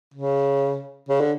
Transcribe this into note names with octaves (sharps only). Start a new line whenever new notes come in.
C#3
C#3
D3